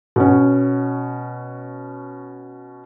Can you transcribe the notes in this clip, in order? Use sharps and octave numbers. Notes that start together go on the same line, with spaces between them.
B2 C#4